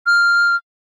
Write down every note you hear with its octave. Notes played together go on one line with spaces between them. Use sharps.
F6